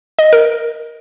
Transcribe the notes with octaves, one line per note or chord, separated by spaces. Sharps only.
D#5
A#4